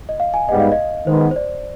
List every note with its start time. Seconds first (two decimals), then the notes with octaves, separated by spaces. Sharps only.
0.09 D#5
0.20 F5
0.34 G#5
0.49 G#2 G3 B3 D#5
0.60 F5
0.72 D#5
1.07 D#3 G#3 B3 C5
1.31 C5
1.36 D5